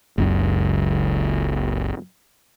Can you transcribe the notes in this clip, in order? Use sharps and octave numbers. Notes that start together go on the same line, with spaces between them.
F#1 C#2 F#2